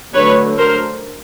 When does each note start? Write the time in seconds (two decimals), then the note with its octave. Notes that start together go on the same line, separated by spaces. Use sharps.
0.14 D3 F#3 A3 B4 C#5
0.58 A#4 C5